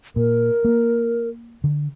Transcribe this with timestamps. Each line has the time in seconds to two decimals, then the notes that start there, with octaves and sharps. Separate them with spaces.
0.16 A#2 A#4
0.65 A#3
1.64 D3